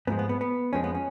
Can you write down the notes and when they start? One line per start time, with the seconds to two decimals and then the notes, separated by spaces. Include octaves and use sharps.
0.07 G#2 F3 G#3 B3
0.19 B3
0.29 B3
0.41 B3
0.73 F2 F3 G#3 C#4
0.84 B3
0.95 C#4